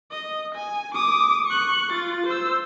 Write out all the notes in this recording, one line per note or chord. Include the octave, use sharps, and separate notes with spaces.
D#5
G#5
D6 D#6
C#6 F#6
F4 A6
C5 E6